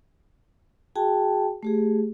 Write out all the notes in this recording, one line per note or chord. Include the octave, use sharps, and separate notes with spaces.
F#4 G#4 G5 A5
A3 G4 G#4